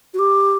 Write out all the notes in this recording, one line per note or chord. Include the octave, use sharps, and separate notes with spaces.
F#4
G4